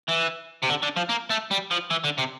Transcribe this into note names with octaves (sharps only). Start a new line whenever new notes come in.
E3
C3
D3
D3
F3
A#3
A3
G3
F3
E3
D3
C3